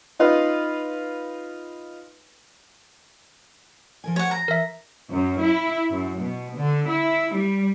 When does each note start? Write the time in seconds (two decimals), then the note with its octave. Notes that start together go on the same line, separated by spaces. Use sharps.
0.19 D#4 F4 B4
4.04 F3 A#4 G#5
4.16 C#5 F#5
4.31 A#5
4.48 E3 A#4 E5
5.12 F#2
5.43 E4
5.90 F#2
6.20 B2
6.56 D3
6.88 E4
7.34 G3